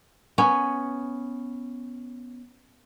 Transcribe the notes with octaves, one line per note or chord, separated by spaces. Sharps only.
B3 C#4 C#5